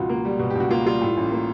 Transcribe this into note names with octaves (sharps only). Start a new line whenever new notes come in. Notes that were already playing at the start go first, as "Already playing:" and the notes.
Already playing: C#2 B2 F3 F4 F#4
A#3
G3
B2
G4
C#2
F#4
A#3 F4
G3 F4
A2
A1
A#3